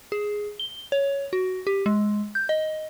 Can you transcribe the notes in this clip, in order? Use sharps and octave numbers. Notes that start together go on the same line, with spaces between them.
G#4
G7
C#5
F#4
G4
G#3
G6
D#5